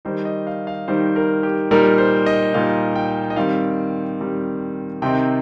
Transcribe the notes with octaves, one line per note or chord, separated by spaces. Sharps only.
D#3 G3 D#4 C5
D#5
F5
F5
D#3 G3 D#4 C5
A#4
G4
A#2 G3 D#4 A#4
C5
D#5
A#2 G3 D#4 F5
G5
D#5
D#3 G3 C4 F5
D#3 G3 C4
C3 D#3 C4 D#4 G5